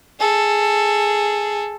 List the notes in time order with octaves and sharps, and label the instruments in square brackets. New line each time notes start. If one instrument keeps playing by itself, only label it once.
[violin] G#4 A4